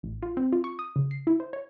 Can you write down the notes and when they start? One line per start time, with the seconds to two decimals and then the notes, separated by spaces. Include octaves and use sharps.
0.03 A1
0.23 F4
0.37 C4
0.53 F4
0.64 C#6
0.79 D#6
0.96 C#3
1.11 C7
1.27 E4
1.40 C5
1.53 C#5